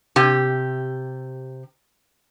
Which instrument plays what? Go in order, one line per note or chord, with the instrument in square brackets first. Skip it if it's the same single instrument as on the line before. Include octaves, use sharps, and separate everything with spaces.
[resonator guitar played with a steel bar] C3 G4